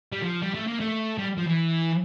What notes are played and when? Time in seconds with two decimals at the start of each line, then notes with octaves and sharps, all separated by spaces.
0.12 G3
0.22 F3
0.42 G3
0.54 A3
0.67 A#3
0.80 A3
1.18 G3
1.37 F3
1.47 E3